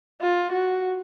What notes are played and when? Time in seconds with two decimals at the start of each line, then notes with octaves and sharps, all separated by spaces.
0.22 F4
0.52 F#4